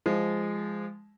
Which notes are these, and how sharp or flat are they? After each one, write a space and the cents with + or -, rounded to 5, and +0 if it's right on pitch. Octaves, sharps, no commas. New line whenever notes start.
F3 -20 G#3 -10